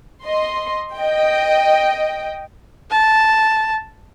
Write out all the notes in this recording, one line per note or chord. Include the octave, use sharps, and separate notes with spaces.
D#5 C6
D#5 G5
A5